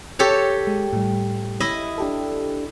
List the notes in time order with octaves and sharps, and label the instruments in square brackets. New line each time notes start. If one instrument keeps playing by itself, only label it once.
[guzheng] G4 A4 C#5
[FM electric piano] G#3
A2 G3
[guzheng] E4 D#5
[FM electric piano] D4 G4 A4